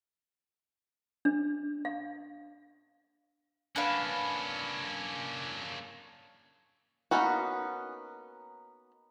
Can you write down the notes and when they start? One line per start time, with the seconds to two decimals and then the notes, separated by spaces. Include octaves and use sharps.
1.25 D4
1.85 F5
3.76 A#3 C#4 D4 B4 F5
7.11 A#3 B3 C#4 D#4 F#4